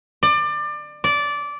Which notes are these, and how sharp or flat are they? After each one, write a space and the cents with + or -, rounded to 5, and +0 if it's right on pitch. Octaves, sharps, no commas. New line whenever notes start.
D5 +25
D5 -15